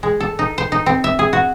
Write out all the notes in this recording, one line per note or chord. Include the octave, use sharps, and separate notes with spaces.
G#3
A4
D#4
C5
D#4
C4
E5
G#4
F#4